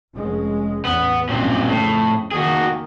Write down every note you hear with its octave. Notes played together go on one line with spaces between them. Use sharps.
F1 G#3 C#4
A1 E2 B3
B1 G2 A#2 C4 C#4
F2 A2 C#3
D#3 A#3 F#4 G#4